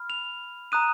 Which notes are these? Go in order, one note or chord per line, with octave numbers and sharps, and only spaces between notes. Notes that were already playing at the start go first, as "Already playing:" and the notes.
Already playing: B5 F6
F7
A#5 D#6 F#6 D#7